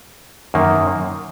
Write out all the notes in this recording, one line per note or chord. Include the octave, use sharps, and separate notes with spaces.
F#2 D#3 A#3